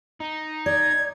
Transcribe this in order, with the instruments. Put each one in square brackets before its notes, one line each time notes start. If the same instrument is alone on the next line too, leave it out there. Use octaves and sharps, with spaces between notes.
[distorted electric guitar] D#4
[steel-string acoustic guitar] D5 [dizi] G#6